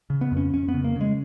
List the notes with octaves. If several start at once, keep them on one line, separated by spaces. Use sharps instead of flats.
C#3
B3
F2
C#4
F2 C#4
B3
C#3
A#3
C#3 G#3